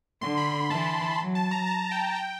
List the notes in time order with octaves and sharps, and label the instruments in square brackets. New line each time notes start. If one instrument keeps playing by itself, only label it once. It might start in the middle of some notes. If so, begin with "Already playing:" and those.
[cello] D3 [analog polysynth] C6
[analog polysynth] B5
[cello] E3 [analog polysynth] A5
[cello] F#3
[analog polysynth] A5
A#5
A5
G5
G5